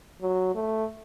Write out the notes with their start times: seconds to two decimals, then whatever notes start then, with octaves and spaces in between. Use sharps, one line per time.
0.21 F#3
0.55 A3